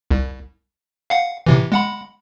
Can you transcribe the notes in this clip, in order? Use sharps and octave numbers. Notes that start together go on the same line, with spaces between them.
C2
F5 F#5
A2 C3 E3
G#3 F#5 B5